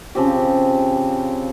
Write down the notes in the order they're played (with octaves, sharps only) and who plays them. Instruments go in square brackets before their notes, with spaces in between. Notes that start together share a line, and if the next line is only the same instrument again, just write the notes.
[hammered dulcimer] C#3 F3 C4 G4